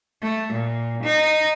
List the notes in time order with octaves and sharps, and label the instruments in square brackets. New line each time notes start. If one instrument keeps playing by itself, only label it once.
[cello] A3
A#2
D#4